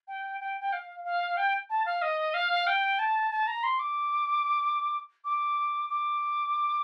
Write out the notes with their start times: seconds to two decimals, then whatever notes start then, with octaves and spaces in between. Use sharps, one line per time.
0.08 G5
0.41 G5
0.61 G5
0.73 F5
1.05 F5
1.37 G5
1.70 A5
1.86 F5
2.02 D#5
2.34 F5
2.67 G5
2.99 A5
3.31 A5
3.47 A#5
3.63 C6
3.79 D6
5.25 D6
5.90 D6